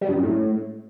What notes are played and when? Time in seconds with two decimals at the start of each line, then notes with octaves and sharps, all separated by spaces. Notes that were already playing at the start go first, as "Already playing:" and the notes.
0.01 G3
0.09 G2
0.16 F#2
0.23 A2